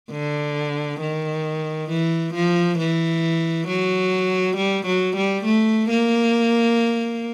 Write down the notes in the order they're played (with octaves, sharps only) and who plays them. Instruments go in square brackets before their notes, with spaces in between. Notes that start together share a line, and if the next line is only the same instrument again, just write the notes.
[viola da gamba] D3
D#3
E3
F3
E3
F#3
G3
F#3
G3
A3
A#3